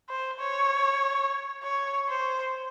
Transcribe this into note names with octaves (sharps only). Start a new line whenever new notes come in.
C5
C#5
C#5
C5